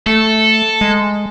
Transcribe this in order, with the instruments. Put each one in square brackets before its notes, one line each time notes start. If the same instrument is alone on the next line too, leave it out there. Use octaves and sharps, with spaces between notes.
[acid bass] A3 [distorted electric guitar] A4
[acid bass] G#3